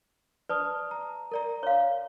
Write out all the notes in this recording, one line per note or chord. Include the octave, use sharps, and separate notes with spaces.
B4 D5 A5 D#6
A#5
A#4 D5 A#5
C#5 F5